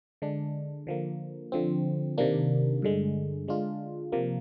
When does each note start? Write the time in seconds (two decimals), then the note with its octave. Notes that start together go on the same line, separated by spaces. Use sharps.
0.22 D3 G#3 D4
0.87 D3 F3 A#3
1.52 D3 F3 C4
2.18 C3 D#3 A#3 D4
2.82 G2 D3 G#3
3.48 D3 G#3 D4 F4
4.12 C3 F3 A#3